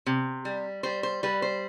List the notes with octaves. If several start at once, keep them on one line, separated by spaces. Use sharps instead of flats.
C3
G3
G3 C5
C5
G3 B4
C5